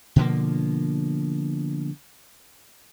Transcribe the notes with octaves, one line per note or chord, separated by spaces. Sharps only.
B2 D3 F3 A#3